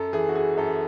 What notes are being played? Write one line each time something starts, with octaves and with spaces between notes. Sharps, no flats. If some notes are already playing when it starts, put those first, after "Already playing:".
Already playing: F#2 A4
E3 G#4
F#4
G#4
F#2 A4